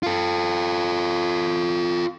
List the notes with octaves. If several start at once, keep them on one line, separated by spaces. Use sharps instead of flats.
F4 A4